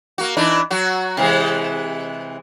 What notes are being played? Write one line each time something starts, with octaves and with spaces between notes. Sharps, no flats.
A#3 F#4
E3 D4 D#4
F#3 F#4
C3 E3 G#3